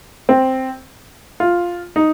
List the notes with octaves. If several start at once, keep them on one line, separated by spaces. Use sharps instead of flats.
C4
F4
D#4